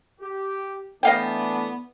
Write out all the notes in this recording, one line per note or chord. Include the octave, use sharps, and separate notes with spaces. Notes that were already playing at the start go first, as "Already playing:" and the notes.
G4
E3 A3 B3 D4 D#5 F5 G5